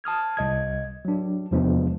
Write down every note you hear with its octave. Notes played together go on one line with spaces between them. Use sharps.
A5 D#6 F6 G#6
C2 D#5 G#6
F#3 D4
E2 C3 F3 G#3 B3 D4